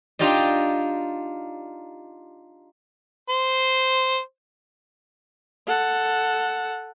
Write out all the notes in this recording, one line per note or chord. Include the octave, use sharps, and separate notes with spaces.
D4 D#4 F4 G4 D5 D#5
C5
A4 F#5